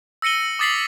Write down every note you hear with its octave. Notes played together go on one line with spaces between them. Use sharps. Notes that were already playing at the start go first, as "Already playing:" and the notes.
E6 A#6 C#7 D#7 G7
D6 D#6 A6 B6 C7 F#7